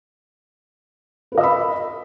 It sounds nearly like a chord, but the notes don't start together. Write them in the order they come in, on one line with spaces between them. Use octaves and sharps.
B4 A#4 D#5 E6 B5